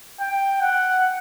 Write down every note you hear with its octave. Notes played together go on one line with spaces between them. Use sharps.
G5
F#5